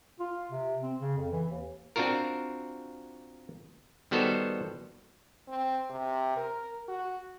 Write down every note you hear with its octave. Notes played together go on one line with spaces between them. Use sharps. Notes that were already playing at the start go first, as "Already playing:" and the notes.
F4
C3
C4
C#3
F2
E3
D#2
C4 D4 F4 F#4 A#4
D#3 G3 B3 F#4 A4 C5
C4
C3
A#4
F#4